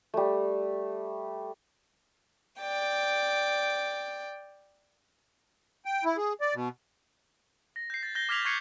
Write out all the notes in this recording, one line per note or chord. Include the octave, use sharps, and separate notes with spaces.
G3 A3
D5 G5
G5
E4
G#4
D5
B2
A#6
G6 C7
A6 C7
G6 A#6 G7
D6 F6 G#6 B6 F7 F#7
C#6 F#6 G#6 C7 C#7